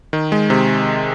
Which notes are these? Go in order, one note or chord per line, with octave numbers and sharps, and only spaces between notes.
D#3
G#3
C3